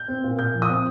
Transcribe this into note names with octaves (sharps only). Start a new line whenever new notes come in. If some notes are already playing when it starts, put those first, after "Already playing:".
Already playing: G6
C4
A#2
A#2 G6
F3
D#6
C4